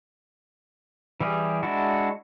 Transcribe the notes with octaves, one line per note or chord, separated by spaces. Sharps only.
E3 G3 G4 G#4
G#3 D4 E4 F#4